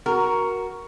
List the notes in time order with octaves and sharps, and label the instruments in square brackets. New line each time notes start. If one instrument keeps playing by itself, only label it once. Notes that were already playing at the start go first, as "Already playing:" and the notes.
[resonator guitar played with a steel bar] F#4 A#4